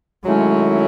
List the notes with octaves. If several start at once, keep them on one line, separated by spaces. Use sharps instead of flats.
D#3 F#3 G#3 A3 C#4 E4